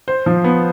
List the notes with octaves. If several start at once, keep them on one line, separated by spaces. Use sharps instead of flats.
C5
F3
B3